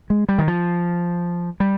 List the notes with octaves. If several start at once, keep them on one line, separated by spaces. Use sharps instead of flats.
G#3
G3
D#3
F3
G3